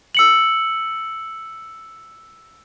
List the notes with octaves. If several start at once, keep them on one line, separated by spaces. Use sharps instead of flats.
E6 C#7 F#7